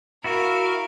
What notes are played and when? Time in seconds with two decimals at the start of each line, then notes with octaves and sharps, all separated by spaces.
0.24 E4 F#4 A#4 F5